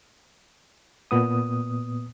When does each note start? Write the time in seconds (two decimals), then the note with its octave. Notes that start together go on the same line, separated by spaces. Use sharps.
1.11 A#2 B3 D#6